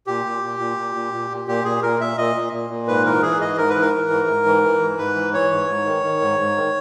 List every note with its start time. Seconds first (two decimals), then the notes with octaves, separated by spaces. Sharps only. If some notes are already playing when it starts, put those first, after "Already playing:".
0.07 A#2 G4
0.25 A#2
0.42 A#2
0.59 A#2
0.77 A#2
0.95 A#2
1.13 A#2
1.30 A#2
1.48 A#2 G4
1.65 A#2 G#4
1.83 A#2 A#4
2.00 A#2 E5
2.18 A#2 D#5
2.36 A#2
2.53 A#2
2.70 A#2
2.87 G#2 B4
3.05 E3 A#4
3.22 E3 G#4
3.40 G#2 D#5
3.58 G#2 A#4
3.70 B4
3.76 E3
3.81 A#4
3.93 E3
4.11 G#2
4.28 G#2
4.46 E3
4.63 E3
4.80 G#2
4.98 G#2 B4
5.15 E3
5.34 E3 C#5
5.52 G#2
5.69 G#2
5.86 D#3
6.03 D#3
6.21 G#2
6.39 G#2
6.57 D#3